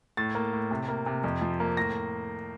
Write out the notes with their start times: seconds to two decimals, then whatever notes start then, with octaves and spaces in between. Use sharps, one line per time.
0.17 A2 A6
0.35 A#3
0.53 A2
0.71 C3
0.88 A#3
1.06 C3
1.24 F2
1.41 F3
1.60 A#3
1.77 A2 A#6